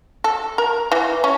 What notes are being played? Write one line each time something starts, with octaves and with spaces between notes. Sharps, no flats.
A4
A#4
E3
C#4